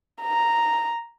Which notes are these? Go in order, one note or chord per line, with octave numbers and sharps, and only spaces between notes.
A#5